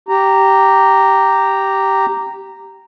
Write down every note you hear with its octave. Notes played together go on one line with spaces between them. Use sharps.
G4 A#5